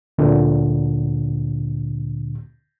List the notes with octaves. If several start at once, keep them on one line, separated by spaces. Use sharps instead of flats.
D2 A#2 D3